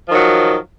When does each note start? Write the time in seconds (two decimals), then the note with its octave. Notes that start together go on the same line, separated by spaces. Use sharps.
0.06 F3
0.10 D#3
0.15 F#3